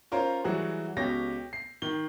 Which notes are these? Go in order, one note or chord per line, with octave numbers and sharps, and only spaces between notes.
C#4 F4 A#4 C5 C#5
E3 F#3 G3 F#4 G#4
C#2 B2 G4 C#5 A#6
C7
D#3 G7